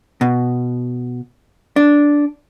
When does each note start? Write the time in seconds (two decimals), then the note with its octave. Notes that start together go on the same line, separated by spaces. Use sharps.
0.21 B2
1.76 D4